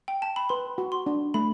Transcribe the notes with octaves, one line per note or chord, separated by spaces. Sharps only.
G5
A5
B5
B4 C6
F#4
C6
D4
A3 B5